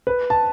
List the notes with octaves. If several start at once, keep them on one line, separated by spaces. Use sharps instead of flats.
B4
A5